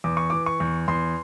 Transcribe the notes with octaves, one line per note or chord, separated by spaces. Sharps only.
E2 D6
C#6
E3 D6
C#6
E2
E2 C6